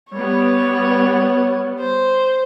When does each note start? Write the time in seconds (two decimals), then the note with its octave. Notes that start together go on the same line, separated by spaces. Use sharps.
0.12 G3 B3 C#5
1.80 C5